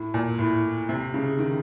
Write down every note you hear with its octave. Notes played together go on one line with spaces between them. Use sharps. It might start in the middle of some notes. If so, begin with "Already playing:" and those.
Already playing: A2
A#2
A2
C3
C#3
D#3